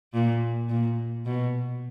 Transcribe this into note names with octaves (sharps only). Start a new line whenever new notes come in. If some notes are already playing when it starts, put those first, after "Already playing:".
A#2
A#2
B2